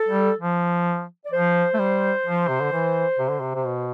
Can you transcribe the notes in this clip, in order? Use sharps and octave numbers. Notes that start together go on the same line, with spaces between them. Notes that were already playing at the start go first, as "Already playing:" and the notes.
Already playing: A4
G3
F3
D5
F3 C5
A3
G3
F3
C3
D3
E3
C3
D3
C3
C3
B2